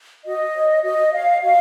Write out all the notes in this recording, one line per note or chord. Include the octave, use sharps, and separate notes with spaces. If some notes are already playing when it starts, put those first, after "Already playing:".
F#4 D#5
C#5
F#4 D#5
C#5 F5
F#4 F5